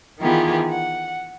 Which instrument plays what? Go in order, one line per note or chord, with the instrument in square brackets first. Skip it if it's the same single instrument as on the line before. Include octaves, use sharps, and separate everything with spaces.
[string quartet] D#3 E3 B3 F4 G4 G#4
F#5